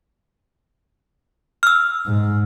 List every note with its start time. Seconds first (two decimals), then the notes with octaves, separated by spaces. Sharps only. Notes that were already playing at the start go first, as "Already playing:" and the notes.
1.63 E6 F6
2.07 G#2